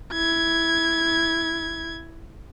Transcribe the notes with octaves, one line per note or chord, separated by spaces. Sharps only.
E4 G#6